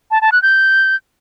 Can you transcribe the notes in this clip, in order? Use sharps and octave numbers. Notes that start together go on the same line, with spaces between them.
A5
A5
F#6
G6